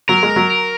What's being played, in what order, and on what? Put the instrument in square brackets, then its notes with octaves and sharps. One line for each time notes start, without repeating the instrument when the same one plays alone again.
[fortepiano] F#3 [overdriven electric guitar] A#4
[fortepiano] G#3
F#3